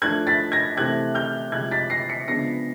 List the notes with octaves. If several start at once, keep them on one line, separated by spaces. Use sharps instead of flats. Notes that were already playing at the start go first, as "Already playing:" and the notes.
F3 A3 D4 F#6 G#6
A6 B6
G#6 A#6
C3 E3 A3 C4 F#6 G#6
F6 G6
C3 F3 G#3 F#6 G#6
A6 B6
A#6 C7
B6 C#7
C#3 F3 G#3 B3 D4 A#6 C7